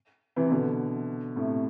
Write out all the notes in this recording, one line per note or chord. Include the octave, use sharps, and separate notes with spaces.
C3 E3
B2 D3
A2 C3